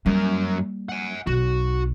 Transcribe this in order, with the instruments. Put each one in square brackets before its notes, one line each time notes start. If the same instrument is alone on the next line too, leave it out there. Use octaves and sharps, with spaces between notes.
[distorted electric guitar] F#2 A#4 [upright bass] G3 A#3
[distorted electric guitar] F#5 G#5
[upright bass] B1 [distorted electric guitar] F#4